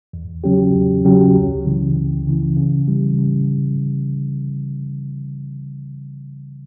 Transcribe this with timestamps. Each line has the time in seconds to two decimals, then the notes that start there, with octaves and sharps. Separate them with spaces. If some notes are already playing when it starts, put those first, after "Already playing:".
0.13 E2
0.44 C#3 F#3 C#4 G4
0.75 E2
1.05 C#3 F#3 C#4 G4
1.36 C#2
1.66 C#3 E3
1.96 C#2
2.27 C#3 E3
2.57 C#3
2.87 E3 G3
3.18 C#3